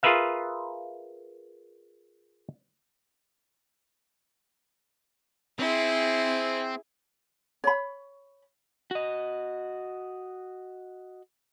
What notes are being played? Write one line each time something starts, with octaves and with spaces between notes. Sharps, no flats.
F4 G#4 A#4 B4 E5 F5
C4 E4 G#4
C#5 B5
F#4 D#5